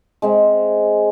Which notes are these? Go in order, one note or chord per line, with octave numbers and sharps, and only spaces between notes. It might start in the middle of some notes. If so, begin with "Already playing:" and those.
G#3 C4 E5